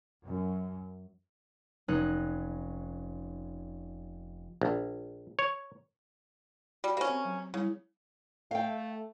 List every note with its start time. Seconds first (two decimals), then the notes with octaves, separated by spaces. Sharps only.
0.24 F#2
1.88 F1 C#4 D#4 F#6
4.62 A#1
5.39 C#5
6.84 G3 F#4
6.97 A#3 C#4 G4 C5 B5
7.09 C4
7.25 F#3
7.54 C#3 G3 E4
8.51 A3 F5 G5